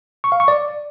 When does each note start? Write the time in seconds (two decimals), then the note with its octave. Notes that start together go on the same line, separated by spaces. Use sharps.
0.24 C#6
0.32 F5
0.40 C#6
0.48 D5